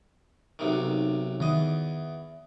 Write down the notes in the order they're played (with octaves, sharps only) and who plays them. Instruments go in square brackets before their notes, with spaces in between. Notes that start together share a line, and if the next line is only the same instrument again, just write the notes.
[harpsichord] B1 C3 D#3
[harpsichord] E2 D#5 [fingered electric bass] D#3